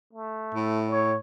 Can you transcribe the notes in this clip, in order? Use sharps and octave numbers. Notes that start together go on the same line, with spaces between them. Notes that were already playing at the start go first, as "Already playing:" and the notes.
A3
A2
C#5